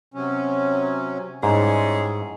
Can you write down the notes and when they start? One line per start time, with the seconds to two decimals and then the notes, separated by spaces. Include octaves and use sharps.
0.14 C3 F#3 C#4
1.43 G#2 G3 G#3 C#4 E4 G#4